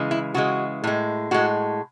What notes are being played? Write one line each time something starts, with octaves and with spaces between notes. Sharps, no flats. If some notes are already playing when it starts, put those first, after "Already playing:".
Already playing: C#3 E3 G#3
E4
C#3 E3 G#3 F#4
A2 G#3
A2 G#3 F#4